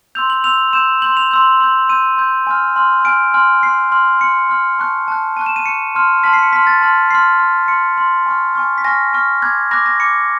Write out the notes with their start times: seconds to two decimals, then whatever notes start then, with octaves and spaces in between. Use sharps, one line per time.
0.15 C6 E6 G6 F7
0.30 F#7
0.44 C6 E6 G6 F7
0.73 C6 E6 G6 E7
1.02 C6 E6 G6 F#7
1.17 F7
1.31 C6 E6 G6
1.60 C6 E6 G6
1.89 C6 E6 G6 D#7
2.18 C6 E6 G6
2.47 G#5 C6 F6
2.76 G#5 C6 F6
3.05 G#5 C6 F6 D7
3.34 G#5 C6 F6
3.63 C6 F6 C7
3.92 C6 F6
4.21 C6 F6 C#7
4.49 C6 F6
4.79 A5 C#6 F#6
5.08 A5 C#6 F#6
5.37 A5 C#6 F#6 D#7
5.46 E7
5.56 D#7
5.66 A5 C#6 F#6 C#7
5.95 A5 C6 F6
6.24 A5 C6 F6 B6
6.33 C7
6.43 C#7
6.52 A5 C6 F6 B6
6.67 A6
6.81 A5 C6 F6
7.11 C6 F6 C7
7.39 C6 F6
7.68 C6 F6 C#7
7.97 C6 F6
8.26 G#5 C#6 F6
8.55 G#5 C#6 F6
8.78 B6
8.84 G#5 C#6 F6 A#6
9.13 G#5 C#6 F6
9.42 B5 D6 F#6 G#6
9.71 B5 D6 F#6 A#6
9.86 A#6
10.00 B5 D6 F#6 C#7